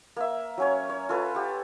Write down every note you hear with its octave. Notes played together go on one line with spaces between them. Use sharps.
A#3 E5
F#3 C#4 C#5
C#5
F4 A4 B4
G4 F#5